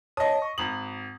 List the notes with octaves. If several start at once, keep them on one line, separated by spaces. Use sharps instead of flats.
C#5 D#5 A5 D#6
C#6
G#1 D#6 F#7